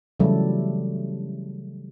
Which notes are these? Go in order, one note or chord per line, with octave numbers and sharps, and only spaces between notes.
C#3 E3 F#3 G3 A3 A4